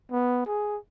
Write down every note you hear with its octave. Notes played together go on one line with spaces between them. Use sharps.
B3
G#4